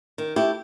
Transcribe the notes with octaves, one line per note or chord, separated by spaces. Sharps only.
D#3
A3 E4 G4